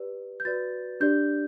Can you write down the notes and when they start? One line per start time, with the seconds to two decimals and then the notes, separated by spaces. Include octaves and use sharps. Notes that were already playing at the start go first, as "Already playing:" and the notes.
Already playing: G4 B4 D5
0.40 G6
0.45 F#4 B4 D5 A6
1.00 D4 G4 D5 G6